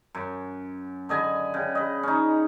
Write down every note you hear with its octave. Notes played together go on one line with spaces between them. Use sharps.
F#2
D3 D#5 G#5 B5
C#3 G5
D#5 B5
C#4 D#4